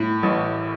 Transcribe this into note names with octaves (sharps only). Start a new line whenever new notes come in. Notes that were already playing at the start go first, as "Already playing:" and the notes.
Already playing: A2
A1